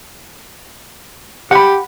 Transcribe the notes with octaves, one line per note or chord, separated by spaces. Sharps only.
G4 F#5 B5